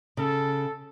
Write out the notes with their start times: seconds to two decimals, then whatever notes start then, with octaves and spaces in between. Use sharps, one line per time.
0.17 C#3 A4